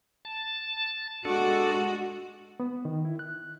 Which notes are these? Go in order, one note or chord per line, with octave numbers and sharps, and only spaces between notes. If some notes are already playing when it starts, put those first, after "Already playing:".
A5
G#3 D4 F#4 A4
B3
D#3
E4
F#6